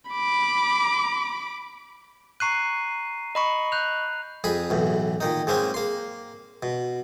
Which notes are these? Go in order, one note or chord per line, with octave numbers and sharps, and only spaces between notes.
B5 D6
A#5 C#6 F#6 C7 D#7
D#5 B5 C#6
F#6 G6 F7
F2 G#4 B5
B1 E2 A2
A#2 D#3 D#4
G#2 G#3 A#3 C4 C#4
A#3 C6
B2